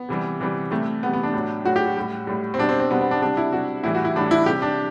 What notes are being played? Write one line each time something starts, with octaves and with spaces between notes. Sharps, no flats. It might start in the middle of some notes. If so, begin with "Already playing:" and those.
Already playing: B3
C3 E3 G3
C3 E3 G3
C3 E3 G3 A3
C3 E3 G3 B3
B3
D4
A2 F#3
A2 F#3 F#4
G4
F#4
A2 G3
A2 G3
C4
B2 G3 D4
C4
C4
B2 G3 B3
B3
D4
C3 G3 D4
E4
C3 G3 F#4
A2 E3 G3 E4
F#4
E4
A2 E3 G3 D4
E4
C3 G3 G4
D4